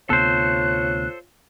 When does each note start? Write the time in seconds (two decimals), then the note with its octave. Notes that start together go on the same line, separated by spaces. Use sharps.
0.10 D2 C3 B3 F4 A4 C5 C#5 F#6